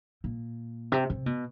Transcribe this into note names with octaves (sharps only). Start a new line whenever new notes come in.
A#2
C3
C3
B2